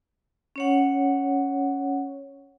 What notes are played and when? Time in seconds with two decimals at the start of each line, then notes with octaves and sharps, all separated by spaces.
0.56 C#4 C#5 F#5